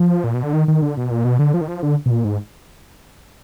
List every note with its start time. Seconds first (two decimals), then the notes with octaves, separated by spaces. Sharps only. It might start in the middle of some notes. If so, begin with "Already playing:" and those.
Already playing: F3
0.24 A#2
0.34 B2
0.43 D3
0.53 D#3
0.68 D#3
0.82 D3
0.97 B2
1.11 A#2
1.25 B2
1.39 D3
1.54 F3
1.61 D#3
1.68 F3
1.83 D3
2.06 B2
2.11 A#2
2.25 G#2